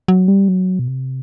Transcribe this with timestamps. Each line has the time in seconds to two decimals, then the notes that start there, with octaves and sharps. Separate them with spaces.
0.08 F#3
0.28 G3
0.48 F#3
0.79 B2
0.88 C3